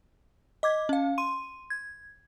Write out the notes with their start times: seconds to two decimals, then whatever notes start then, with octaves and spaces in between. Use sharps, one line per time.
0.63 D#5 D6 G#6
0.89 C#4 F5
1.18 C6 D#7
1.70 G#6